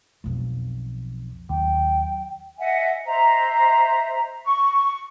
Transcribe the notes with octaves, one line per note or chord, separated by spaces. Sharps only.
B1 F2
D#2 F#3 G5
D#5 E5 F#5 G#5
C5 D#5 E5 A#5
C#6